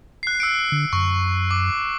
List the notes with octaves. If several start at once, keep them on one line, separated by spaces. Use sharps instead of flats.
F#6 C7
E6 C#7 D7
D3
F#2 C#6
D6